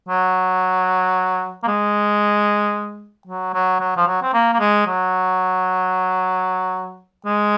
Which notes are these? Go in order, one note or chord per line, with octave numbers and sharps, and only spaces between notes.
F#3
A#3
G#3
F#3
F#3
F#3
F3
F#3
C4
A#3
A#3
G#3
F#3
G#3